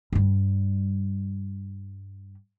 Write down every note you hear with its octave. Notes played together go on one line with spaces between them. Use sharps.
G2 G3